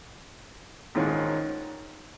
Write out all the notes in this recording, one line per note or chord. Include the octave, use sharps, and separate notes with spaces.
A#1 G#2 D#3 G#3 C#4